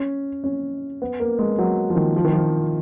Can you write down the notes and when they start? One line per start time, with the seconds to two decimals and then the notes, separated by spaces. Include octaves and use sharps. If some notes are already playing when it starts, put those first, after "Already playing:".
Already playing: C#4
0.44 C#4
1.02 B3
1.20 A#3
1.39 G#3
1.59 F#3
1.90 F3
1.96 D#3
2.16 F3
2.24 D#3
2.33 F3